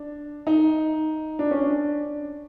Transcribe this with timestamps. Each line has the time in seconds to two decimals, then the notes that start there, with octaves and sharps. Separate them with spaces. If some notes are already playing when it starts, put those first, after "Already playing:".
Already playing: D4
0.47 D#4
1.39 D4
1.51 C#4
1.63 D4